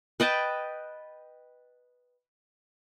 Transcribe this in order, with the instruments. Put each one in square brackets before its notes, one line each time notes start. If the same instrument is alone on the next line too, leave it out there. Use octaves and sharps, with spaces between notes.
[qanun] B4 D#5 G5 A5